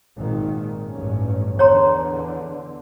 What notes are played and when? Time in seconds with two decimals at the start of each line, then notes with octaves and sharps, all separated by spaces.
0.17 G#1 A#2 D#3
0.92 A1 G2 C#4
1.59 E2 D3 C#5 A#5 C6